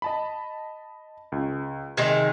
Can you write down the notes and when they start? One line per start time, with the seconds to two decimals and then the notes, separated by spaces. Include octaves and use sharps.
0.02 D#5 A5 B5
1.32 C#2
1.97 C3 D#3 G#3 F6 G#6 C7